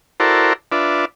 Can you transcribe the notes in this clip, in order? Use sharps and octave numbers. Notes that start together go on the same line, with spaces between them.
E4 F#4 A4 A#4 C5 D5
D4 F4 B4 D5 E5